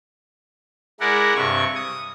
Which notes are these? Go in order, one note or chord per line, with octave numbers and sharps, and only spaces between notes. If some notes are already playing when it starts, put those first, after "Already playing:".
G#3 E4 A#4 D5 F#5
G2 C3 C#6
D#6